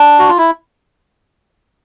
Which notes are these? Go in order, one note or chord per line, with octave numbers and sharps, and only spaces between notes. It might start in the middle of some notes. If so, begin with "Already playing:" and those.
Already playing: D4
F#4
F4
E4